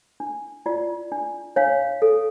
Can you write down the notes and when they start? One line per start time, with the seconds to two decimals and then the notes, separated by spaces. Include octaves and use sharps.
0.20 D4
0.66 F4 D5
1.12 D4
1.56 D4 C#5 F5
2.02 A4